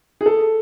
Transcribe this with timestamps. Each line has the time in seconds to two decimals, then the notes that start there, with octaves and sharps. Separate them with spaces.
0.21 G#4
0.26 A4